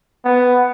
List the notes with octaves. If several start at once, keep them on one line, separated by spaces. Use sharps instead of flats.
B3